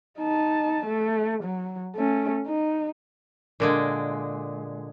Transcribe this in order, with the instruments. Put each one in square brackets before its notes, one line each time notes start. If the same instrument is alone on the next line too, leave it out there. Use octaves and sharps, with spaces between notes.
[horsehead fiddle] D#4 A5
A3
F#3
A3 C#4
D#4
[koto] A#2 D3 G#3